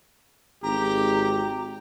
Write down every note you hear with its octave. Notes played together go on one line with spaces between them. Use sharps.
G#1 G4 A#5